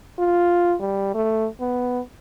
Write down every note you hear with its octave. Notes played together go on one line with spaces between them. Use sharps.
F4
G3
A3
B3